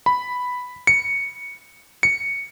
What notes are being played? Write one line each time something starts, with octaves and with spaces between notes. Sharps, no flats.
B5
C#7
C#7